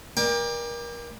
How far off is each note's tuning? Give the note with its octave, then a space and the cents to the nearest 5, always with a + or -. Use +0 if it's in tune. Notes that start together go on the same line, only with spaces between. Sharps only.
A#4 +30 D5 +15 G5 +40